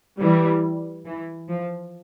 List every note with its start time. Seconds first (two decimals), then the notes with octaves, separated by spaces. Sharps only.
0.19 E3 G3
1.05 E3
1.48 F3